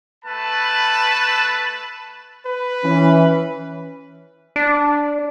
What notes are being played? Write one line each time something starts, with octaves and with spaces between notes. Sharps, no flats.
A3 B4 A5 B5
B4
E3 C#4
D4